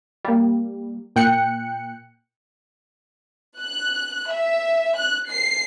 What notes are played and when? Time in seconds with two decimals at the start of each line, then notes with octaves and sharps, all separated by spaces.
0.25 G3 A#3
1.16 A#2 G5 F#6 C#7
3.60 F#6
4.31 E5
4.96 F#6
5.29 C7